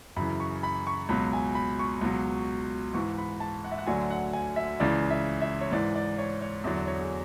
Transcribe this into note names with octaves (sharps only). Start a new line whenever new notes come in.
F#2 C#3 E3 B5
C#6
B5
C#6
C#2 B2 F#3 B5
G#5
B5
C#6
C#2 B2 F#3
G#2 E3 C#6
B5
A5
F#5
E5
F#5
D2 D3 F#3 G#5
F#5
G#5
E5
C#2 C#3 E3 D5
E5
E5
C#5
G#2 E3 D5
D5
C#5
C#5
E2 D3 F#3 D5
C#5
G#4